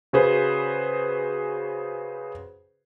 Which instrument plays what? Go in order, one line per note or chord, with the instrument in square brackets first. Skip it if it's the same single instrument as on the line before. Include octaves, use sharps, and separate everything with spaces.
[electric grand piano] C#3 F#4 G#4 B4 C5